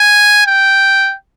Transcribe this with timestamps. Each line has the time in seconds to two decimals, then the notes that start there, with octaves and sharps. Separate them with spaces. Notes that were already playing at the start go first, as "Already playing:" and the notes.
Already playing: G#5
0.47 G5